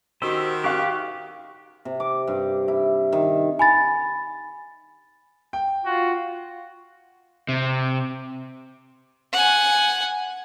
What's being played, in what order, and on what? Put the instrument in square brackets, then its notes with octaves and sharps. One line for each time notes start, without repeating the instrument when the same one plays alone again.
[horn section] D#3 [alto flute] F#4 [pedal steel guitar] G4 C5 [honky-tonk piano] E6
[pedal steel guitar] G4 [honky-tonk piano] F5 C#6 F#6
[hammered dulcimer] C3
D6
G2
E4
D#3
[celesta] G#5 B5 A6
[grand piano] G5
[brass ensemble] F4 [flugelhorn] F#4
[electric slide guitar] C3
[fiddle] F#5 G#5